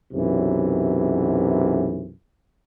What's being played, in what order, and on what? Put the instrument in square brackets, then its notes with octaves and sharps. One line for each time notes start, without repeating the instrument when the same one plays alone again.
[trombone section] B1 F#2 C3 E3